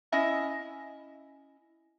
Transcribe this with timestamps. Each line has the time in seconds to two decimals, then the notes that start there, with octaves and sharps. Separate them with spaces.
0.12 C#4 E4 D#5 E5